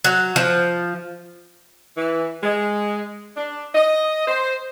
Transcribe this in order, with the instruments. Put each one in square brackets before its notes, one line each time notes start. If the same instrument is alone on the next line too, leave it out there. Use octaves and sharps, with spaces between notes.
[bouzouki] F#3
F3
[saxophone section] E3
G#3
D4
D#5
C5